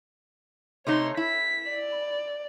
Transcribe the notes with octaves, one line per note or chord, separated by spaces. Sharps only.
C3 A3 D#4 C#5 C6
E4 B6
D5